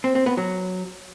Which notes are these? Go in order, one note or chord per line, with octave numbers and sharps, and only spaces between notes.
C4
C4
B3
F#3